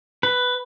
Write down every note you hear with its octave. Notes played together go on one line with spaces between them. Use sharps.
B4